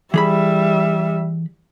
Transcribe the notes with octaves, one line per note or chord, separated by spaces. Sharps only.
E3 G3 G#4 E5 B5